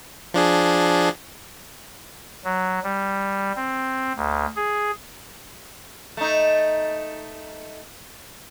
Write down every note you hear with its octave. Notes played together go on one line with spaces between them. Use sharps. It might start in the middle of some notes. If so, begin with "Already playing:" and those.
F3 D4 G#4
F#3
G3
C4
D2
G#4
A3 D#4